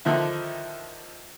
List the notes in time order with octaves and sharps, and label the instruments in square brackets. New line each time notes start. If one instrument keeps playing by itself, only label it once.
[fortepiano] D3 D#3 F3 E4